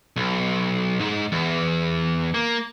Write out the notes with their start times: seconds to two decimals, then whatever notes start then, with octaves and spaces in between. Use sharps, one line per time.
0.16 B1
1.00 G#2
1.32 E2
2.34 A#3